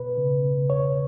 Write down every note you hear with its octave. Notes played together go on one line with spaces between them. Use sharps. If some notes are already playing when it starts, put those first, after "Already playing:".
Already playing: B2 B4
C#3
C#3
E2 C#5